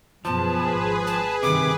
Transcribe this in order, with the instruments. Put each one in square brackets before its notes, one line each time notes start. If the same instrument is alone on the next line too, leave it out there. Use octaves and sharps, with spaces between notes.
[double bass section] F#2 B2 B3 [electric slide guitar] F3 [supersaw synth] G#4 B4 [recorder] A5
[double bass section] G#1
[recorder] A5
[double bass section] G2 D#3 [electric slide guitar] C3 [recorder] D6